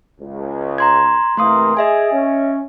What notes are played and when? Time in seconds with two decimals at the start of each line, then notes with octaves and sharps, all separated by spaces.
0.21 C#2
0.78 A#5 C6 G#6
1.37 C3 E3 A3 A#3 C6 D#6
1.77 G#4 D#5 E5 G#5
2.13 C#4